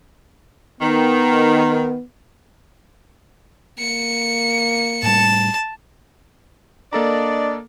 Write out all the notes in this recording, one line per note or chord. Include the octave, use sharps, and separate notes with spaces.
D#3 B3
A#3 C#7
A2 G3 A5
A#3 D4 A4 D5 D#5 A#5